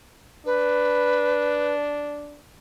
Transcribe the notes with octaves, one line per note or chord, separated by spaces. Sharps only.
D4 B4